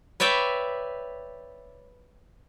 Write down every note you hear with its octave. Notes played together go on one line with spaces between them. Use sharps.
B4 C#5 D5 E5 G5